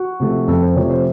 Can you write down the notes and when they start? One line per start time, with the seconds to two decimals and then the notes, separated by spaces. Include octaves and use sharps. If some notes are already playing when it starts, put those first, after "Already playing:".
Already playing: F#4
0.20 C3 F3 A3
0.48 F2 A4
0.62 C5
0.76 C3 F3 A3 C#5
0.90 C5